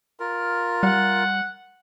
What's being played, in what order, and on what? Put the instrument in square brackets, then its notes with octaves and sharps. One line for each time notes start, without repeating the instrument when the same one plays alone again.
[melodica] F4 A#4
[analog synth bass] G3 [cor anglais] F#5